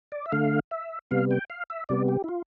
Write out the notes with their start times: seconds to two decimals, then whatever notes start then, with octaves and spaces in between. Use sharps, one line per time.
0.12 D5
0.26 E5
0.32 D3 A3 F5
0.71 E5
1.11 C3 G3 B3 F5
1.31 G5
1.50 F5
1.70 E5
1.89 C3 G3 B3 D5
2.08 G4
2.24 E4
2.28 F4